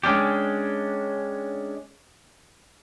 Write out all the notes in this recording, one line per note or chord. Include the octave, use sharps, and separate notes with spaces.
G#3 C#4 D4 G4